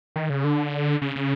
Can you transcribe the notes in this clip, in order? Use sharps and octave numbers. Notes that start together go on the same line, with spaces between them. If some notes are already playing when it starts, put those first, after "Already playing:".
D#3
C#3
D3
C#3
C#3